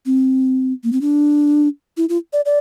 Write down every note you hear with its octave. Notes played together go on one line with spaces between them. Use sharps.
C4
A#3
C4
D4
E4
F4
D5
D5